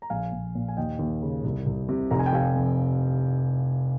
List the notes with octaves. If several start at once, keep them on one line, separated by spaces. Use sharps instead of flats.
A#5
A#1 F5 G#5
A#1
A#2
G#5
D#2 D#5 G5
D#2
C#3
C2
C2
C3
F1 A#5
G#5
G5
F1 F5 G#5
F2